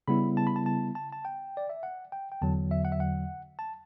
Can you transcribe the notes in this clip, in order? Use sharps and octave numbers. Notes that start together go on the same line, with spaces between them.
C#3 G3 B3 E4 B5
A5
B5
A5
A5
A5
A5
G5
D5
E5
F#5
G5
G5
E2 D3 F#3 A5
E5
F#5
E5
F#5
A5